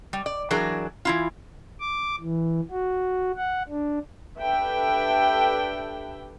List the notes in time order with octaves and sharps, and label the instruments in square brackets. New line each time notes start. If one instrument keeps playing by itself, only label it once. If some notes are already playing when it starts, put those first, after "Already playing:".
[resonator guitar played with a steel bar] G3
D5
E3 F#3 D4 G#4 A#4
E3 E4 F4
[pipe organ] D6
E3
F#4
F#5
D4
[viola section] D4 G4 A4 B4 E5 G5